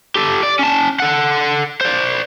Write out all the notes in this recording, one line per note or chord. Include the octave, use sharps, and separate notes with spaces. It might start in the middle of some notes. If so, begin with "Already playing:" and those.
G4 A4
D5
C#4 A5
A4 F#5
C5 D5